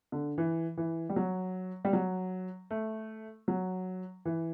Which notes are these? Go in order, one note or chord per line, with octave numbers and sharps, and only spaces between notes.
D3
E3
E3
G3
F#3
G3
F#3
A3
F#3
E3